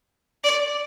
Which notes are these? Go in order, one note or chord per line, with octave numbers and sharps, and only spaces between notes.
D5